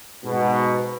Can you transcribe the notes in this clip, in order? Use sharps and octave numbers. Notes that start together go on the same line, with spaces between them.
G#2 B2